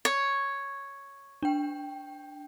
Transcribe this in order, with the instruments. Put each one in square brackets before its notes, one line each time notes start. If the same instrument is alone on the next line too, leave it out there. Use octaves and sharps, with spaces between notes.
[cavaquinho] C#5
[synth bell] D4 G5